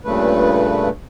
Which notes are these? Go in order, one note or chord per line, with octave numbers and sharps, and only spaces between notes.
G2 A#2 C#3 A3 B4